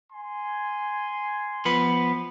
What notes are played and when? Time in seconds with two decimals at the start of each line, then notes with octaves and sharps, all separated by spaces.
0.12 G#5 C6
1.65 F3 B3 B4